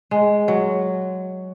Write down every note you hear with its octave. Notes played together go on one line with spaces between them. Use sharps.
G#3
F#3